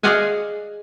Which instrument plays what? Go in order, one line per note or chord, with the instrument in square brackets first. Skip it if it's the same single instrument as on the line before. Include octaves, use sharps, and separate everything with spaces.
[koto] G#4 D5 D#5 F5 F#5 G#5